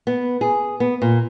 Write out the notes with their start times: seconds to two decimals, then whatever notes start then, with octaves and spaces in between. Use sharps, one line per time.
0.07 B3
0.41 G#4
0.80 B3
1.02 A#2